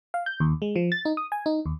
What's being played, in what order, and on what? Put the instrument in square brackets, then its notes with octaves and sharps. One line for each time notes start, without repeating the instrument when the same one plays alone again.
[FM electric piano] F5
G6
D#2
G#3
F3
A6
D#4
D#6
G#5
D#4
D#2